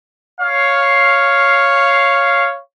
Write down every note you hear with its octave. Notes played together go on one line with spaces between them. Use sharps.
C#5 F5